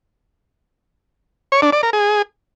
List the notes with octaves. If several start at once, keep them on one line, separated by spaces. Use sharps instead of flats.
C#5
D4
D5
A#4
G#4